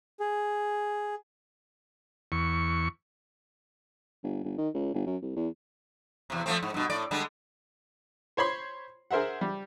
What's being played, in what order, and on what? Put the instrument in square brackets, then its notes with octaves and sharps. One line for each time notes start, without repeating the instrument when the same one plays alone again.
[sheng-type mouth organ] G#4
[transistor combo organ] E2 C#6
[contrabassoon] G1
G1
D#3
C#2
G1
F#2
C2
E2
[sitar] E2 C3
F3 A3 C4
G#2
G2 B2
A2 D5
D3 G3 G#3
[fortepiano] C5 C#5 B5 C6
G#4 A#4 C5 E5 F#5
G3